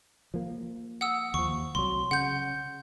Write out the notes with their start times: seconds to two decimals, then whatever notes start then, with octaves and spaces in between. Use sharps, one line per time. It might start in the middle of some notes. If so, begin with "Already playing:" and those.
0.34 F3 A#3
1.01 F#5 D#6 E6
1.34 D#2 F3 C#6
1.75 C2 F#3 C6
2.11 C#3 F#5 G6